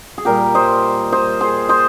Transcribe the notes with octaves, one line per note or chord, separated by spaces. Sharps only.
G#4
A#2 G3 G4 A#4
C5 D#5
C5 D#5
G#4 C5
C5 D#5